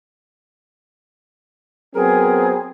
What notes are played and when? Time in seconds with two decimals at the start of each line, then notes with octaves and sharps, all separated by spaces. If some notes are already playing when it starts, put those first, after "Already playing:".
1.95 F#3 B3 C4 G#4 A#4